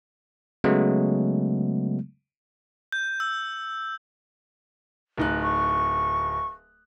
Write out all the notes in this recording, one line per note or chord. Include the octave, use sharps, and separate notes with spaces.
C#3 F#3 G#3 A3 B3
G6
E6
D1 D#4 F#6
C#6